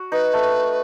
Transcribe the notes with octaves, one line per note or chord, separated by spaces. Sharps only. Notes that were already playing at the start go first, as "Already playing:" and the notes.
Already playing: F#4
D#4 B4
A3